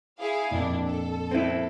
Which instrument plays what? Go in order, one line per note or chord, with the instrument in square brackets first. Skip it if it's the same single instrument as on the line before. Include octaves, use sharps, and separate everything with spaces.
[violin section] E4 G#4 F5
[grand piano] F2 A#2 [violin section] D4 E4
[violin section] A4
[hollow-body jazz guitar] C4 E4